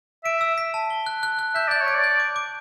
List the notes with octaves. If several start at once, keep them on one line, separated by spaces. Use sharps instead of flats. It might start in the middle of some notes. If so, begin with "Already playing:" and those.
E5 D7
E6
B6
A5
G7
F#6
F#6
F#6
E5 G6
D5 G6
C#5
D7
D5
G6
D6
D6